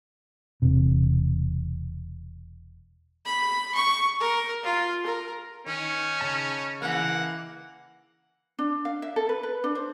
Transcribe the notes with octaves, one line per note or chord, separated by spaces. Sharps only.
E1 C3
B5
C#6
A#4
F4
A#4
D#3 C#4
C#3 A5
E3 A#3 F#5
D4
F5
E5
A4
B4
B4
D4
C5